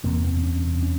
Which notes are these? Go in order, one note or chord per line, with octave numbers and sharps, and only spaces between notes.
F#1 E2 C3 A#3
B3
C#4
C#4